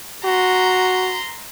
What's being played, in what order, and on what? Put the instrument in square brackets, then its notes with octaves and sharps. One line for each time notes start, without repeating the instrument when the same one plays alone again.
[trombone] F#4 [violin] A#5 C6